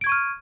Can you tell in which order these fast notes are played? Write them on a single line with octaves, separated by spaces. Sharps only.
D7 G#6 C#6 D#7 F6